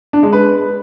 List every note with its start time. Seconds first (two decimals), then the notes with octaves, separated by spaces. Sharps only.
0.13 D4
0.23 G#3
0.33 B4